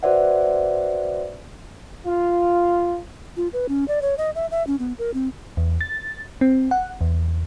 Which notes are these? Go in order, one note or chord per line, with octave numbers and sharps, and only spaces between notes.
F#4 B4 C5 D5 E5 F#5
F4
F4
B4
C#4
D5
C#5
D#5
E5
E5
C#4
B3
A#4
C4
E2
A6
C4
F#5
E2